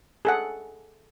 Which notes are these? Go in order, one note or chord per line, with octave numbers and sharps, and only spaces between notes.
G#4 A4 F#5